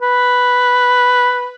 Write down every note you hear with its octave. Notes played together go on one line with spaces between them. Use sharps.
B4